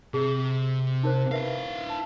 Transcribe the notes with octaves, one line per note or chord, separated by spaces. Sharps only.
C3 G#4
D#4 A#4 C5
E4 A#4 B4 E5 F5
A5